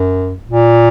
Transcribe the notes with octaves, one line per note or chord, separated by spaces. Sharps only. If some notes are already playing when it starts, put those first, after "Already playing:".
Already playing: F#2
A#2